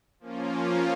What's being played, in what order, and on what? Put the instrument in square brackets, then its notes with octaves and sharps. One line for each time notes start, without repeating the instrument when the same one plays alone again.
[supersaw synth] F3 A#3 C#4 F4